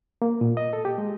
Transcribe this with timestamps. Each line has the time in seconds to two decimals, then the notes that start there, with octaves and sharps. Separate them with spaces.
0.22 A#3
0.41 A#2
0.57 D#5
0.73 A4
0.85 G4
0.98 G#3